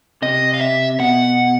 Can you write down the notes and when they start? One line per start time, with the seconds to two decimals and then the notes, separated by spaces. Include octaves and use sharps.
0.22 C3 D#5
0.54 F5
0.61 E5
1.00 B2 F#5